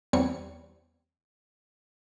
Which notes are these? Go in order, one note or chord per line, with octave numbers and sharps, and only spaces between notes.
E2 G3 B3 C4 C#5 C#7